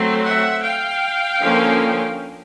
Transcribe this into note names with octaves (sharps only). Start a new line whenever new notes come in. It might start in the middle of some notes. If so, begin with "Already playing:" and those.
Already playing: F#3 A3 C4
E5 F#5
F5 G5
D3 F3 A#3 C#4